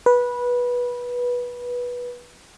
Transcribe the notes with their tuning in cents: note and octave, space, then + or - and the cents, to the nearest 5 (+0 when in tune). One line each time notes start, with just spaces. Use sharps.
B4 -15